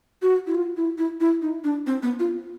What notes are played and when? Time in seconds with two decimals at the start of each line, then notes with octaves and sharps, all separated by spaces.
0.22 F#4
0.47 E4
0.55 F4
0.76 E4
0.98 E4
1.20 E4
1.42 D#4
1.64 D4
1.87 C4
2.03 B3
2.19 F4